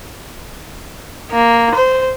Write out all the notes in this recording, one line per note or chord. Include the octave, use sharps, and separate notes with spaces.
A#3
C5